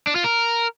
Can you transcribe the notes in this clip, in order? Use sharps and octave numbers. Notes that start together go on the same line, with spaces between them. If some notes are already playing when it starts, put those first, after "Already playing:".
D4
F4
A#4